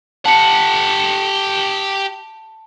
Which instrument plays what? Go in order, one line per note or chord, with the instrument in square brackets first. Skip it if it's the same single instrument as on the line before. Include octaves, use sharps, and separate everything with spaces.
[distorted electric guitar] G4 F#5 [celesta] A5 C#7